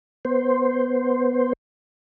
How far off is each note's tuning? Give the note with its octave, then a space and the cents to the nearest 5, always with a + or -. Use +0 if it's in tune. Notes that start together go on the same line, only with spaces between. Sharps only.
B3 +0 C5 +0